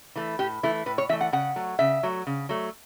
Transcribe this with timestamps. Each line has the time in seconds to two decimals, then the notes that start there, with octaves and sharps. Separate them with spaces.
0.16 E3 A3
0.39 A2 G4
0.63 E3 A3 E4
0.86 A2 B4
0.98 C#5
1.09 E3 E5
1.12 A3
1.21 F#5
1.32 C#3 F#5
1.56 F#3 A3
1.79 C#3 E5
2.03 F#3 A3
2.27 C#3
2.49 F#3 A3